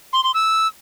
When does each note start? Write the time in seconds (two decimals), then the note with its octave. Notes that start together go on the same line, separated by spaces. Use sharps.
0.13 C6
0.24 C6
0.34 E6